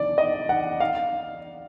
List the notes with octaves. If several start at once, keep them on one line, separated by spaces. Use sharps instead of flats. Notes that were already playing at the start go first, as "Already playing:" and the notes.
Already playing: D5
D#5
F#5
F5